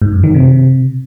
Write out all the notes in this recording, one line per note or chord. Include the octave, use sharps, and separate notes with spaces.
G#2
F#2
D#3
C3